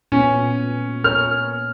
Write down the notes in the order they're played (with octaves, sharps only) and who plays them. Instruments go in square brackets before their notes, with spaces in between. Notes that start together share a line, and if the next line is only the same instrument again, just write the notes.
[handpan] A#2 A3 B3 [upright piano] C#4
[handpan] A#4 C#5 [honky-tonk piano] F6